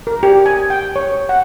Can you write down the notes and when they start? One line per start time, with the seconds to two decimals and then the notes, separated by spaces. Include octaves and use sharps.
0.07 A#4
0.23 G4
0.46 G#5
0.70 G5
0.96 C#5
1.29 F#5